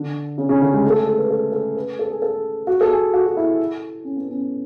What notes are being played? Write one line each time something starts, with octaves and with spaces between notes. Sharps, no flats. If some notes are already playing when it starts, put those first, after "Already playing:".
Already playing: D3
C#3
C#3
D3
G#3
A3
A4
G#4
A4
B4
A4
A4
B4
A4
G#4
A4
F#4
A4
G#4
F#4
F#4
E4
C#4
B3
C#4